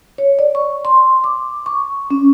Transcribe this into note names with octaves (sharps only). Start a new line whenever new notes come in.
C#5
D5
C#6
C6
D6
C#6
C#4